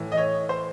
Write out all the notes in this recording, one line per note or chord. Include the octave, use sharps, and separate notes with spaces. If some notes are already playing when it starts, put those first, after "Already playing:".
Already playing: A2 E3
D#5
C#5
C5